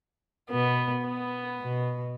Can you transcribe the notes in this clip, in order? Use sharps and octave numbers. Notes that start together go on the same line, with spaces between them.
B2 B3
B3
B2